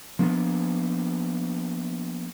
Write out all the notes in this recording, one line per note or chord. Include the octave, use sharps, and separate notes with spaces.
F3 A#3 B3 D4